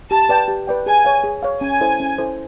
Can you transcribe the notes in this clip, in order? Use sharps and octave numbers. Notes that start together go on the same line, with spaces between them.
G4 A5
B4 D5 G5
G4
B4 D5 G5
G#4 G#5
C#5 F5
G#4
C#5 F5
C#4 G#5
E4 A4 C5
C#4
E4 A4 C5